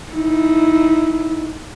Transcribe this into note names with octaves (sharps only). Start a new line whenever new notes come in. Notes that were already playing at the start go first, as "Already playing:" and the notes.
D#4 E4